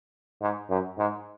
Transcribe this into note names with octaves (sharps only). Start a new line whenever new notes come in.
G#2
F#2
G#2